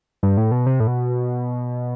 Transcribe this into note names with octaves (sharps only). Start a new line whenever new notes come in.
G2
A2
B2
C3
A2
B2